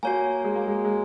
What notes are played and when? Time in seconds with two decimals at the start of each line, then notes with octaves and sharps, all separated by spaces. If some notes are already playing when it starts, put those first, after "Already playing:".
0.03 A#3 F#4 C#5 G#5
0.44 G#3
0.56 A#3
0.68 G#3
0.85 G#3